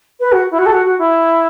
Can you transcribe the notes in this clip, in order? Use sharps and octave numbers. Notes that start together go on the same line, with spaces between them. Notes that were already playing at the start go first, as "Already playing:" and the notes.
B4
F#4
E4
F#4
A4
F#4
F#4
E4